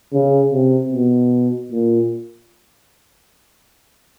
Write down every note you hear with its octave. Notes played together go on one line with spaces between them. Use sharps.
C#3
C3
B2
A#2